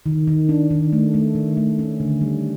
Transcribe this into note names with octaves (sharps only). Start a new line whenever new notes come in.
D#3
D#3
D4
D#3
A3
A3
D#3
A3
C#4
D3
G3